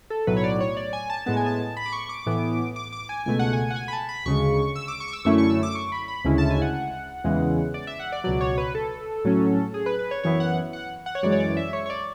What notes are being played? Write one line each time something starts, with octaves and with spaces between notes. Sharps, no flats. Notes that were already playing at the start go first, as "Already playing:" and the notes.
A4
B1 A2 F#3 B4
C#5
D5
C#5
D5
G#5
A5
A2 G#3 B3 A5
G#5
A5
B5
D6
C#6
D6
A2 E3 B3
D6
D6
G#5
C#2 B2 A3 G#5
F#5
G#5
F#5
G#5
B5
A5
B5
D2 C#3 G#3 C#6
E6
D6
C#6
D6
E6
F#2 D3 A3 C#4 E4 C#6
C#6
E6
D6
C#6
B5
B5
D2 C#3 G#3 C#4 E4
A5
G#5
F#5
E2 C#3 E3 G#3
D5
E5
F#5
D5
C#2 B2 F#3 D5
C#5
B4
A4
A2 F#3 C#4
G#4
B4
B4
C#5
F#2 E3 B3 E4 C#5
F#5
F#5
F#5
C#5
F#2 E3 G#3 D5
C#5
D5
E5
C#5
C#5
D5